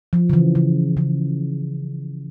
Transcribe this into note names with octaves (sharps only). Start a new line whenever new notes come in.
F3
C#3
E3
C#3
C#3